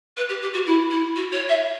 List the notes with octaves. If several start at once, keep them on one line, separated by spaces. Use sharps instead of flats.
B4
G4
G4
F#4
E4
E4
F#4
C#5
E5